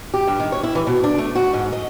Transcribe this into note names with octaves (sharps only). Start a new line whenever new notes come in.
G4
G2
D#3
C#5
E4
E3
B2
D4
A3
F#4
G#2
D#5